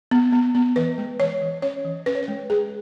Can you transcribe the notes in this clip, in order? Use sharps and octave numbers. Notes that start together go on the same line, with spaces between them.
B3
B3
B3
E3 B4
G#3
E3 C#5
E3
C#4 C#5
E3
C#4 B4
C#5
B4
G#3
G#3 G#4